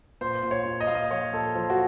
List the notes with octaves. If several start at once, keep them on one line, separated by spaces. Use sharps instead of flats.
A#2 C5
A#2
C#5
A#2
D#5
A#2 F5
D#5
F3 C#5
A#2 A4
F3
F#4